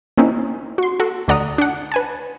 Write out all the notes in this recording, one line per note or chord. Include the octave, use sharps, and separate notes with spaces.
A#3 C4 C#4 D#4 E4
F#4 C6
F#4 A4
D2 A3 D5 F#5 A#5 D#6
D4 F#5
B4 G#5 A5